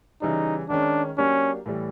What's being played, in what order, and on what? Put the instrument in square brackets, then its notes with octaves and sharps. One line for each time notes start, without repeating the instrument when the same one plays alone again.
[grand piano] C#3 E3 G3 [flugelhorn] D#4
[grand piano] D#3 G#3 C#4 [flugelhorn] D4
[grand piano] F#3 A#3 D4 G4 [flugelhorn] C#4
[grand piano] A2 E3 G3